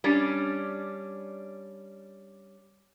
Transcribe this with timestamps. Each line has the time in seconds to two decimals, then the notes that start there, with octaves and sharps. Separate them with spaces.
0.04 G3 C#4 D4